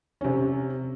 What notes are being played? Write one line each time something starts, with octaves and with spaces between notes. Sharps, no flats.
C3 C#4